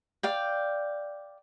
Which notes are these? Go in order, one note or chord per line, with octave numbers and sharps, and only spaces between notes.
D5 F5 G5